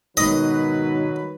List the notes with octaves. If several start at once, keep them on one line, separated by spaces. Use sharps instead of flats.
G#2 B2 D#3 F#3 B4 D#5